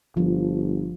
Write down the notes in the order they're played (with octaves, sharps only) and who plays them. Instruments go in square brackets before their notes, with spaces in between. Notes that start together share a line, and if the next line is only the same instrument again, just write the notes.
[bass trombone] G1 [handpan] F3